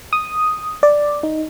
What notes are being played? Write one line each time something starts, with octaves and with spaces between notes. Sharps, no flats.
D#6
D5
D#4